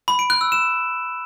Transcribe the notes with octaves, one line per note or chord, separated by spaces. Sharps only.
B5
D7
F#6
E6
E7